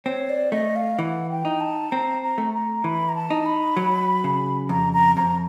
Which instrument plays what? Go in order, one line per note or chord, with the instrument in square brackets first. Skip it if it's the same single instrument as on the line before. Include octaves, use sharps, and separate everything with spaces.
[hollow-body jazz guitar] C4 [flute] C#5
[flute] D5
[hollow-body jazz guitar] A3 [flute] D#5
[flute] F5
[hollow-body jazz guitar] E3 [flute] F#5
[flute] G5
[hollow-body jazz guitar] D#4
[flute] A5
[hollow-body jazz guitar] C4 [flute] A#5
[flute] A#5
[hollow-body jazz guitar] A3
[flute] A#5
[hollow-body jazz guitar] E3 [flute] B5
[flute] A#5
A5
[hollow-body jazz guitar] D#4
[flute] B5
[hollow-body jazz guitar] F#3
C#3
[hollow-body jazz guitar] F2 [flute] A#5
[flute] A#5
[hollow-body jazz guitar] F2 [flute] A#5